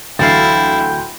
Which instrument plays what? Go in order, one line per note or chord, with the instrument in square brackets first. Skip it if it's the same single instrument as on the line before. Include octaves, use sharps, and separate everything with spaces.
[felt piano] D2 E3 F#3 [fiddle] E4 [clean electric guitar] A4 F5 [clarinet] G5